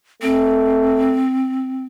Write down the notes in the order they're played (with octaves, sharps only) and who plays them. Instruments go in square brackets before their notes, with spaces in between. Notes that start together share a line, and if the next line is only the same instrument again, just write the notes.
[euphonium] A3 [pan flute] C4